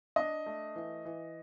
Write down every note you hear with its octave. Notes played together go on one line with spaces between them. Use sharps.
D4 D#5
A3
E3
E3